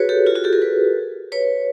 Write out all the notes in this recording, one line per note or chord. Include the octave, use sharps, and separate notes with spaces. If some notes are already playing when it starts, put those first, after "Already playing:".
Already playing: F#4 G#4 B4 C#5
G4 A4
F4 G4
F#4 G#4
G4 A4
G#4 A#4
A4 B4
B4 C#5